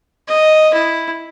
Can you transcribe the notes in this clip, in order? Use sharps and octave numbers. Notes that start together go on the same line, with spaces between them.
D#5
E4